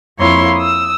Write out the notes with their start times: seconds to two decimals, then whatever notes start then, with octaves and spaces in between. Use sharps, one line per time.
0.18 F2 A#3 E4 C#5 C6
0.56 D#6 E6